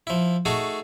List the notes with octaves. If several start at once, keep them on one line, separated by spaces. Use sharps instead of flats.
F3 E4
A3 D#4 F#4 G#4 A4